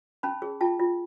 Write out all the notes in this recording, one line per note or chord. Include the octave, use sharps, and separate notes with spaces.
C#4 A5 B5
G#4
F4 G5 A5
F4